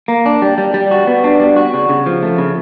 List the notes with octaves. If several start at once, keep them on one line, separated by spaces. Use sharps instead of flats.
A#3
D4
G3
G3
G3
F#4
B3
D4
G3
F#4
C#3
C#3
F3
A3
C#3